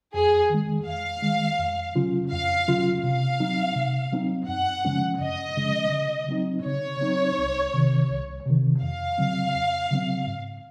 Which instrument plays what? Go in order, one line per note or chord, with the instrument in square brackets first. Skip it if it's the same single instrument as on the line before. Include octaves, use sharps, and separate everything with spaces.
[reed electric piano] F2 [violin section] G#4
[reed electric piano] D#3 G#3
[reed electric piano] F2 [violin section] F5
[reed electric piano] D#3 G#3
F2
C#3 F#3 C#4 F4
[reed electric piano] F2 [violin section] F5
[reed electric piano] C#3 F#3 C#4 F4
[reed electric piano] C3 [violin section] F5
[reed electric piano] F#3 C4 D#4
C3
F#3 C4 D#4
[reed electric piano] F#2 [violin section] F#5
[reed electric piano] C#3 F3 G#3 C#4
[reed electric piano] F#2 [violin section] D#5
[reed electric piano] C#3 F3 G#3 C#4
C#3
F#3 C4 D#4
[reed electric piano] C#3 [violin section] C#5
[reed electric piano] F#3 C4 D#4
C2
C3 D#3
C2
C3 D#3
[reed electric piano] F2 [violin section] F5
[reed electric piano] C#3 F#3 C4
F2
C#3 F#3 C4
G#2